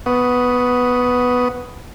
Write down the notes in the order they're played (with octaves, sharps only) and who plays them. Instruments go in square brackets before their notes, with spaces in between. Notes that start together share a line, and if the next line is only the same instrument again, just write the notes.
[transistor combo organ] B3 B4 F#5 C#6 D#6